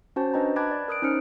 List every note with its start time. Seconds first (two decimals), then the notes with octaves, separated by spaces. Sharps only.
0.16 C#4 F#4 C5 G5 A5
0.33 D4 B4 D#5 G5 A5 A#5
0.56 G5 A5 B5 D6 F#6 G#6
0.71 D5
0.88 A#4 D#6 F#6 D7
1.02 C#4 D#4 C5 F6 C#7